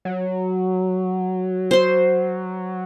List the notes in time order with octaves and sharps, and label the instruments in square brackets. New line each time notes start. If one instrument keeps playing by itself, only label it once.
[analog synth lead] F#3
[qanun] C5 C6